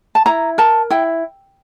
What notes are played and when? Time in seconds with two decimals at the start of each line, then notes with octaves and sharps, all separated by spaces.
0.15 A5
0.26 E4 A#5
0.58 A#4 A5
0.90 E4 G5